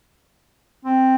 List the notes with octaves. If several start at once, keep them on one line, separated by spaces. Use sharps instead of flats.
C4